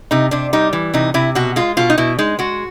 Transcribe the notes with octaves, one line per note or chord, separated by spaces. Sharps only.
C3 D#4
C3 D4
G3 D#4
E3
C3 D#4
C3 E4
B2 F#4
G#3 F4
B2 F4
D#4
B2 E4
G#3 D#4
G#3 F#4